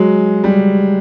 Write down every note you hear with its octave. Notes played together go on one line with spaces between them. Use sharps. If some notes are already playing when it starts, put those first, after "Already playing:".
Already playing: F#3 G#3
G3